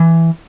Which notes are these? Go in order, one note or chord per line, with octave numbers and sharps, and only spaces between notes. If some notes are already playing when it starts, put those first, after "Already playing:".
Already playing: E3